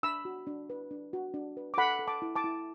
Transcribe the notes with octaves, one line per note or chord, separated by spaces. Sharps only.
D4 B5 E6
F#4
D4
B4
D4
F#4
D4
B4
D6
A4 F#5 B5
A4
A5 D6
E4
A5 D6
E4